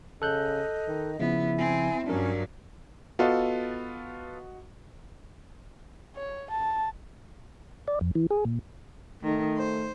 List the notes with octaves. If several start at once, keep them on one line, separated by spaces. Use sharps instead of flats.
C#3 A4 D#5 F#6 G6
D#3
C#3 F3 B3 E4
C4 G#5
G2 F#3 C#4 D4 A#4
B3 F4 F#4 A4 D#5
C#5
A5
D5
F2
E3
G#4
A#2
D#3 A3
C5